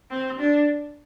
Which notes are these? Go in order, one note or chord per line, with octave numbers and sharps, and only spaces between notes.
C4
D4